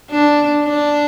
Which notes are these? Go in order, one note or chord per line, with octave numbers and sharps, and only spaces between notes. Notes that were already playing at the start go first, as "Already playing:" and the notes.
D4
D4